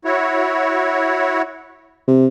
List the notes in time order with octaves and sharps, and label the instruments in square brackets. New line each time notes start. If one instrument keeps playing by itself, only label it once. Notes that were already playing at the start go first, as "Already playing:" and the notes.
[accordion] E4 F#4 C#5
[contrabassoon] C3